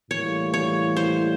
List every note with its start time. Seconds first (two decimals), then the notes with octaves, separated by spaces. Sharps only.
0.11 A2 E3 G3 A#3 C#5
0.54 C#5
0.97 C5